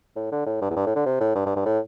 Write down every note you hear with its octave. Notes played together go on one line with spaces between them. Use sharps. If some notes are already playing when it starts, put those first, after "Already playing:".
A2
D3
A2
G2
E2
G2
A2
D3
C3
A2
G2
G2
G2
A2